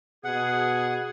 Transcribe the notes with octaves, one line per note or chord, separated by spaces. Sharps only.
B2 G#4 F#5